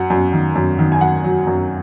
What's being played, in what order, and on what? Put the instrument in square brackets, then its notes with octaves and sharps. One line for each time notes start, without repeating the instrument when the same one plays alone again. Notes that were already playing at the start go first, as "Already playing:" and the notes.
Already playing: [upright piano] F#2 F#3 F#5
F#2
D#3
F#2
D#3
G#5
F#2 F#5
F#3
F#2